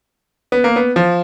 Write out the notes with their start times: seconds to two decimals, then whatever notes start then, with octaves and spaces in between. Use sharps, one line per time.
0.52 B3
0.64 A#3
0.76 B3
0.96 F3